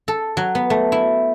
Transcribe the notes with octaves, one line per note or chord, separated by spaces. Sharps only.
A4
F#3
B3
A3
E4